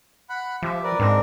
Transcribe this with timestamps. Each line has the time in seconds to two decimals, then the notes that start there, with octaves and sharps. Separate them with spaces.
0.29 F#5 B5 F#6
0.62 F3 G4 E5
0.84 A#4 B4 D5
1.00 G#2 C4 D4 A#4